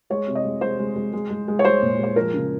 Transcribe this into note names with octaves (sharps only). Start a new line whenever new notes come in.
G#3 C#5
C3
D#5
G#3
G#3 C5
G#3
G#3
G#3
G#3
G#3
C#5
G#3 C5
A#2
G#3 C5
F3 A#4
C#3